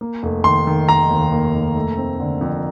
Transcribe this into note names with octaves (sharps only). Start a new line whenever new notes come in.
A#3
F1
D#3 C6
D#3
D#3 A#5
D#2
A#3
F1
A3
C4
D3
F2